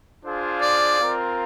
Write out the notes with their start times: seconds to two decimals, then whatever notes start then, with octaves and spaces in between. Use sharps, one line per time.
0.24 D4 F4 G#4 C5 F5
0.62 D5
0.99 C4 F4 A#4 F5